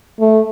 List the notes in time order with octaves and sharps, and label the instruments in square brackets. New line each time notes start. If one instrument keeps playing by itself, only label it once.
[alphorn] A3